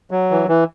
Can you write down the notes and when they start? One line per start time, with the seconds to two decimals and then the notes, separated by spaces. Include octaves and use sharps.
0.11 F#3
0.31 E3
0.49 E3